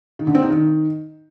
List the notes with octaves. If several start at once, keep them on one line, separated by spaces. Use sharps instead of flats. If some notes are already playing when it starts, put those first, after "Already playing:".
D#3
D3
C4
D#4
D#3